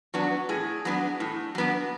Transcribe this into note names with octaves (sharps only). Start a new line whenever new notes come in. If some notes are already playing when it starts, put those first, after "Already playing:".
F#3 B3 D4
A2 G#4
F#3 B3 D4
A2
F#3 B3 D4